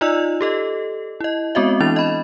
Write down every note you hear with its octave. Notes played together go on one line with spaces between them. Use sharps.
D#4 F4 D5 D#5 E6
G4 A4 D#5
E4 D#5
G#3 B3 C4 F#4 D#5 E5
E3 D4 E4 A6 F7
D#5 B5